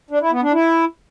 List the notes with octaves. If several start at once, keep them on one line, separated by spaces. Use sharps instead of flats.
D4
E4
B3
D4
E4